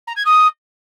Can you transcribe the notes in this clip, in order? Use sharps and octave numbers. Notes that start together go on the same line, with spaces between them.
A#5
G#6
D#6